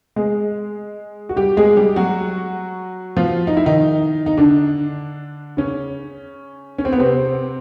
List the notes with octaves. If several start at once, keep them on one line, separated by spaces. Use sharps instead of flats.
G#3 G#4
F#4
G3 G4
G#3 G#4
G3 G4
F#3 F#4
F3 F4
D#4
E4
D#3 D#4
D#4
D3 D4
C#3 C#4
C#4
C4
B3
C3 C4